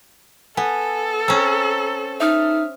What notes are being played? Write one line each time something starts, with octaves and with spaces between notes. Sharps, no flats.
B3 A4 G#5
C4 C#4 A#5 E6
D#4 E5 D#6 F6